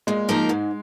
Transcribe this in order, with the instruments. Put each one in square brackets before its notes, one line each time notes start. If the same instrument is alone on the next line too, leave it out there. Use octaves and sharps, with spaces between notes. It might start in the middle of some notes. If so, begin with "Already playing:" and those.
[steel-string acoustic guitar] A#2 [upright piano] G#3
[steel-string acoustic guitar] F3 A#3 D#4 A#4
G#2